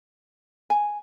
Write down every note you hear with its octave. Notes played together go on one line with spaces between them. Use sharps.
G#5